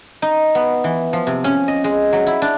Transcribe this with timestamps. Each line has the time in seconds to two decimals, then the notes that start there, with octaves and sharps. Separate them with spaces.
0.22 D#4
0.55 B3
0.84 E3
1.13 F3
1.27 C3
1.44 C#4
1.68 D#5
1.84 G#3
2.13 F#3
2.26 E4
2.42 D4